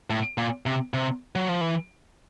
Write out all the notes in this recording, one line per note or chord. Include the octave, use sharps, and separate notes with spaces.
A2
A#2
C3
C3
F#3
F3
E3